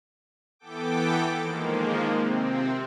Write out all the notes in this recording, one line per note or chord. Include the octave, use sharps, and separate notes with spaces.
E3 B3 A4 G5 D6
D#3 F3 G#3 A#3
C3 C4